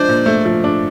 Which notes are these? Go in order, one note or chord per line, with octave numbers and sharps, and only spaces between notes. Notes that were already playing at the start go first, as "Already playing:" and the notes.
Already playing: F3 G#3 D4 C5
A#2
A3
F3
D4